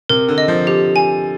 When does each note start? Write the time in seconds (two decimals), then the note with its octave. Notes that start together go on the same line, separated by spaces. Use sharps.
0.09 C3 A#4
0.28 D3
0.38 D#5
0.48 F3
0.67 G4
0.96 G#5